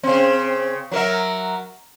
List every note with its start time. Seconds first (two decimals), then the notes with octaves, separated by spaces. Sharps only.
0.03 C#3 C4
0.91 F#3 A#4 E5